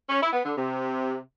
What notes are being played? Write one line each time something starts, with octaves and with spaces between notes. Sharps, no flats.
C#4
E4
B3
D3
C3